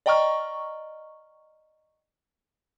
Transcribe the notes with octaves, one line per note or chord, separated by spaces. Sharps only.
D5 D#5 G5 A#5 C#6 F6